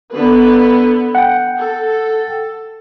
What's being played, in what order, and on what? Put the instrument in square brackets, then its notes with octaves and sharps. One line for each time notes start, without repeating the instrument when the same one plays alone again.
[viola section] D3 B3 B4
[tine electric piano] F#5 G5
[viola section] A4